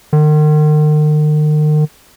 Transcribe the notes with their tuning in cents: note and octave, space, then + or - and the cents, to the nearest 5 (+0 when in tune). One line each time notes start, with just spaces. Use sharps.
D#3 -40